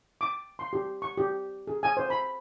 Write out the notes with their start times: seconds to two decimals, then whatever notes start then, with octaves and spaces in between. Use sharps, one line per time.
0.21 D6
0.59 C6
0.73 G4
1.02 C#6
1.17 G4
1.67 G#4
1.83 G#5
1.97 C5
2.10 B5